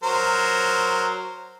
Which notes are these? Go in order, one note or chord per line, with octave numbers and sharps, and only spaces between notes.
F#3 A#4 C5